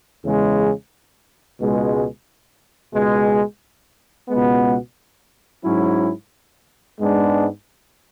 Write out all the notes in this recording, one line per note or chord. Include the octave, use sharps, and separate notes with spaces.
E2 C#3 G#3
C#2 B2 G#3
C#2 B2 G#3
C#2 B2 G#3 B3
G#2 F#3 C#4 E4
G#2 G#3 B3 D4